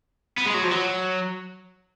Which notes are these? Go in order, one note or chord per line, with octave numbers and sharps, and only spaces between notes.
B3
G#3
F#3
F3
F#3